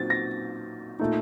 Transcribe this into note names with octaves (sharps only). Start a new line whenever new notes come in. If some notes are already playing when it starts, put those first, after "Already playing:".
Already playing: A#2 F#3 C4 D#4 A6
A#6
A#2 A3 D#4